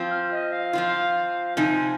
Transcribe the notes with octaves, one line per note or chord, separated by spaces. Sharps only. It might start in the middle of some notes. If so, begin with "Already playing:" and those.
Already playing: F3 C4 F4
F6
D#5
F5
F3 C4 F4
C3 F3 C4 D#4 G#5